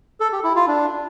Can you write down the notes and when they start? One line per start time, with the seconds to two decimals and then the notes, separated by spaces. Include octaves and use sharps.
0.20 A4
0.32 G4
0.44 E4
0.56 F4
0.68 D4